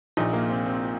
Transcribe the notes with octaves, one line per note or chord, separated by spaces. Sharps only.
A#1 A#2 D#4
A#3
C4
C4